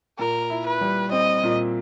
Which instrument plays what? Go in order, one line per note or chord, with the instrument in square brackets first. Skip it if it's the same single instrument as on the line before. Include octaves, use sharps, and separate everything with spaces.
[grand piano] A#2 [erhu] A#4
[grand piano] E4
[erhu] B4
[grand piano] G3
[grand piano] C4 [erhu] D#5
[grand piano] A#2